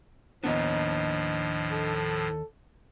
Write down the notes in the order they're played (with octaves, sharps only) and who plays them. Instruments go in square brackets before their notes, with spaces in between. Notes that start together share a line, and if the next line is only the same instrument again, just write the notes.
[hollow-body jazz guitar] D#2 B3 [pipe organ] A2 F3 [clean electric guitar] D4 D#5
[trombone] A4